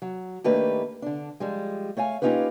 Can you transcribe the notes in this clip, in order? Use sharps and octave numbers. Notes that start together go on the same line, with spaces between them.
F#3
D#3 A3 A#3 D4 G4 B4
D3 D4
F3 G3 G#3
A3 C#5 F5 G#5
A#3 C#4 D#4 F4 G4 B4